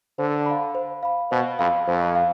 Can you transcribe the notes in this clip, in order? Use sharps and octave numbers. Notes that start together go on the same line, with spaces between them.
D3 C5
F5 B5
C5
F5 B5
B2 C5
F2 F5 B5
F2 C5
F5